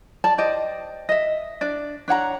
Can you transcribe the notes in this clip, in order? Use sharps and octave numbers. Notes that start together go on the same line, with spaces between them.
D5 A5
G4 C5 D5 D#5
D#5 E5
D4 D5
D4 C#5 F#5 A#5